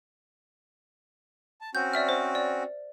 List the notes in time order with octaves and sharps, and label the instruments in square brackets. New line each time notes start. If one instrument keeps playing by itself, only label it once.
[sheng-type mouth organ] A5
[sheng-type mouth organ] C4 C#4 F#4 [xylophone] G6
[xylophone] D5 E5 F6
C5
D5